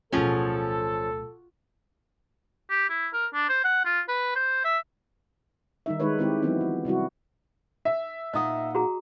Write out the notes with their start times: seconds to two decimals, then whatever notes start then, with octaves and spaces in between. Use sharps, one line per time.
0.12 D1 B2 F3 C#4 F4 F#4 G#4 A4
2.70 G4
2.90 E4
3.13 A#4
3.34 D4
3.49 C5
3.64 F#5
3.86 F4
4.08 B4
4.35 C5
4.65 E5
5.86 D#3 G3 D#4 E5
6.00 D#3 G#3 D#4 B4 C#5
6.19 D#3 G#3 C4 E4 G4
6.43 E3 F#3 B3 C4 E4
6.61 F3
6.85 C3 G3 E4 F#4
7.85 E5
8.33 A#2 D#4 D#5 F#5 D#6
8.75 F#4 G#4 A#5